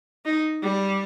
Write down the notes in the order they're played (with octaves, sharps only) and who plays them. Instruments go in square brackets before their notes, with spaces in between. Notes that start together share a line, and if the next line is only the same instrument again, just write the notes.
[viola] D#4
G3